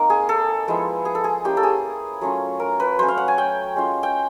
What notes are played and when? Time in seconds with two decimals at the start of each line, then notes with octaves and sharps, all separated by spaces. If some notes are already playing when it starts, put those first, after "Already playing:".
Already playing: A#3 C4 D#4
0.10 G#4
0.29 A4
0.68 F3 G#3 B3 E4
1.05 G#4
1.15 A4
1.24 G#4
1.44 A#3 C#4 E4 G4
1.57 A4
1.63 G#4
2.21 F#3 A3 C#4 F4
2.60 A#4
2.80 B4
2.99 F#3 A3 C#4 C5
3.08 F5
3.18 F#5
3.28 G#5
3.38 G5
3.76 G#3 C#4 F4
4.03 G5